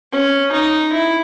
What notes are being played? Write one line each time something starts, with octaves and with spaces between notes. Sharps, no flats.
C#4
D#4
E4